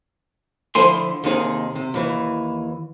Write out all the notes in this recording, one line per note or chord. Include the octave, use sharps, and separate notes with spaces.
D3 F3 E4 C5 G#5 C6
D#2 C3 D#3 D#4 E4 G#4
C3
D#2 E3